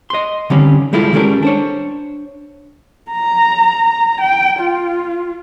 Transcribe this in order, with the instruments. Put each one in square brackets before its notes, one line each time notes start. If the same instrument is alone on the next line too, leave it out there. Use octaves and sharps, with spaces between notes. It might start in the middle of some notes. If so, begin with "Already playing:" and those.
[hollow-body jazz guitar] D#5 C6
D3 D#3 G3 C4 C#4
G3 G#3 E4 F4 A4
D#3 G3 G#3 C#4 A4 A#4
D4 C5 C#5
[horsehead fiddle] A#5
G5
F4